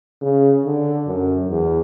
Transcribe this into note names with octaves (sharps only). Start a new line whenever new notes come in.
C#3
D3
F#2
E2